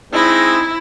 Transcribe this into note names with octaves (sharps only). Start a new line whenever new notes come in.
G#3 C4 D#4 E4